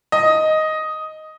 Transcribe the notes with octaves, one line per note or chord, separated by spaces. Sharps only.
D#5